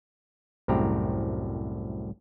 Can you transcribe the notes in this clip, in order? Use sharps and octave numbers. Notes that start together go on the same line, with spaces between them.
C2 F#2 A2 C4 G4 A#5